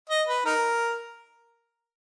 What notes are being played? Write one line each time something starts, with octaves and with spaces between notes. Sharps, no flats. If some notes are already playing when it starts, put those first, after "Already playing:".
D#5
B4
D#4 A#4